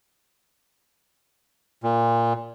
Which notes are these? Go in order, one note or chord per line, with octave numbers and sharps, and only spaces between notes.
A#2